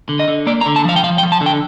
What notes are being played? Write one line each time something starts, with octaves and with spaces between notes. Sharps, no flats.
D3
D#5
D3
A#3 D5
A#5
D3
A5
F3 F5
G5
F3 F5
G5
F3
A5
D3
G5